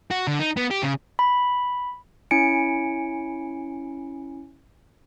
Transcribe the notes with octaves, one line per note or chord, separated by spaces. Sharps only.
F#4
D3
D#4
B3
G4
C#3
B5
C#4 E4 G#5 C#7 D7